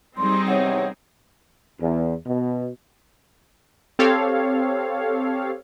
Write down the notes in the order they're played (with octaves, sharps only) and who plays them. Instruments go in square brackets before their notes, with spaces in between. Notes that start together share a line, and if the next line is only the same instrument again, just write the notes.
[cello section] G3 [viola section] C4 D#4 G#4 [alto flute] C6
[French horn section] E2 C3 C#5 [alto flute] F#5
[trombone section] E2
B2
[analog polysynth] C4 G4 A4 C#5 F5